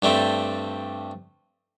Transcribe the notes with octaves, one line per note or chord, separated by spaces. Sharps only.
G2 G3 A3 C4